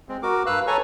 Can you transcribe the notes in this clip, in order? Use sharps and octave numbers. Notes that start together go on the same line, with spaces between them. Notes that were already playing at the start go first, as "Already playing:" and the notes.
G#3 C4
F#4 A#4 D6
G2 B4 F5 E6 F#6
A4 B4 C#5 G#5 A#5 C#6